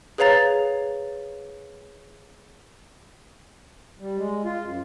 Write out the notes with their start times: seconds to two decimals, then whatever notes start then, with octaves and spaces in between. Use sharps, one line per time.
0.18 G#4 B4 C#5 F5 A#5 A6
3.99 G3
4.17 G#3
4.45 F4
4.64 F#2